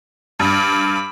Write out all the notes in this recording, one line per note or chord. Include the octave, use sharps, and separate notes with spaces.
G2 B5 D6